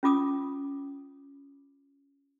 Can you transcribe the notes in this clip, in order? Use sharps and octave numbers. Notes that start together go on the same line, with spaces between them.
C#4 F4 D6 D#6